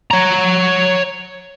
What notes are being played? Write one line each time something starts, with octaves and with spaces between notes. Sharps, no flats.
C#5 A#5